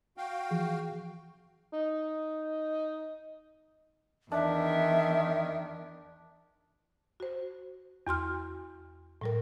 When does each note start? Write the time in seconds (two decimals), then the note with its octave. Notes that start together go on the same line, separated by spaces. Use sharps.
0.17 F#4 F5 G5
0.51 E3 F3 G#4
1.73 D#4
4.32 E2 D#3 D4 E5
7.20 F#4 C5
8.07 E2 F#4 C6 F6
9.21 A2 G3 A#4